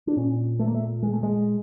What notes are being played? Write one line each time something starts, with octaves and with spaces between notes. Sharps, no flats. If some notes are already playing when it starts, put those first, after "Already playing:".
D4
A#2 C#4
A3
A#3
A3
G#3
A3
G#3